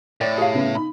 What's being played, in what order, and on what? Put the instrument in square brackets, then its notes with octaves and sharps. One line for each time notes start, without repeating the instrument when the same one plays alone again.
[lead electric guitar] A2 [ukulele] C#5 D5 G5
[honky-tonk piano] G4 [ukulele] G#4 C#5 F5
[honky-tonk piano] C#3 B3
D#4 B5